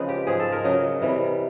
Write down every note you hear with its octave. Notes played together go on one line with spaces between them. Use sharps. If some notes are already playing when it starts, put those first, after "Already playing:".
Already playing: C#3 F3 G#3 B4
G4
G#2 F3 G#3 G#4
A4
A#4
C#3 F#3 D#5
C3 E3 G3